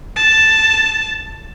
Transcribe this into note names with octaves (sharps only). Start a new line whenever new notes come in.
A5